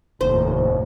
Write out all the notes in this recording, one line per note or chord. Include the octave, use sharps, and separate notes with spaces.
F1 D#2 A2 C5